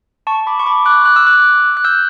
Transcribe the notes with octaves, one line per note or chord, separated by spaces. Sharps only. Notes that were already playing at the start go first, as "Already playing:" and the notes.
A5 C#6
B5 D6
C#6
B5 D6
D6 F#6
F#6
E6
D6 F#6
F#6
E6 G6